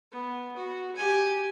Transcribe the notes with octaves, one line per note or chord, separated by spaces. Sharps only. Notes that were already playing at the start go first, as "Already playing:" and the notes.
B3
F#4
G4 G#5